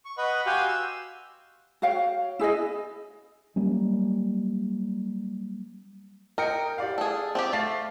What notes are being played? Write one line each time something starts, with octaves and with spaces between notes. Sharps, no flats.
C#6
B4 D#5 F#5 B5 C#6
F#4 G4 F5 G5 G#5 C6
E6
F#4 C#5 F5 G5
E4 G#4 C5 D#5
F#3 G3 A#3 C#4
A#4 D#5 G5 C#7
G4 D5 F5
G#4 A4
C4 F4 G4
A3 F5 A6 C7